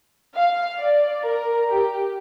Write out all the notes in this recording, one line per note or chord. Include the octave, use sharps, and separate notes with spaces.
F5
D5
A#4
G4